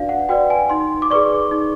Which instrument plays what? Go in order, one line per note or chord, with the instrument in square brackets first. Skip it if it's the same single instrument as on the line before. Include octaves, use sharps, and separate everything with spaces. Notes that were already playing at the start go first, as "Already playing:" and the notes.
Already playing: [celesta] D4 F#4 B4 D5 F5
F#5
F#4 B4 D5 G5
G#5
D#4 C6
D6
G#4 B4 D5 C#6
D#4